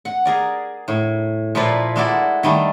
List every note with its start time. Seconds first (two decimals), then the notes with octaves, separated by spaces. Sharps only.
0.05 F#5
0.25 G#4 A#4 D5
0.88 A2
1.55 A#2 F3 E4 A#4 B4 D5
1.96 G#3 A#3 E4 F#4 A4 D5
2.43 D#3 G3 A3